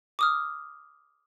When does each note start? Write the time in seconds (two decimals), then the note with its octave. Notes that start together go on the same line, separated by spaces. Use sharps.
0.19 D6 D#6 F6